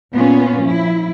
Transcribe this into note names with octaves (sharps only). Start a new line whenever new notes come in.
A#2 B3 C#4 F4
F3 E4